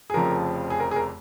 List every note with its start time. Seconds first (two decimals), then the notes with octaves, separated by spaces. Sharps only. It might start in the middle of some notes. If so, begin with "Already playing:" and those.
0.10 G#4
0.14 F1 F2 C#3 F3 A#4
0.70 G#4
0.80 A#4
0.91 G#4
0.96 A#4